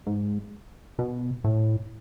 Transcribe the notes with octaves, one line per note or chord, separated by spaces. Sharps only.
G#2
B2
A2